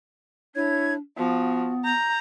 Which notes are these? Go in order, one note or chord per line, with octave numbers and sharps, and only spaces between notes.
D4 E4 C#5 G#6
F3 B3 F#4
A#5 G6